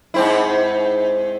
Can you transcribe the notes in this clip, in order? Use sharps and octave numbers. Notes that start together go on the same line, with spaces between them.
G#2 C4 E4